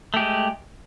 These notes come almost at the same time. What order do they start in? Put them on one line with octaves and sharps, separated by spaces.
A3 G4 G#3